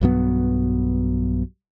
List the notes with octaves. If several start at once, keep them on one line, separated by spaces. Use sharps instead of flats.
B1 G2 F#3 B3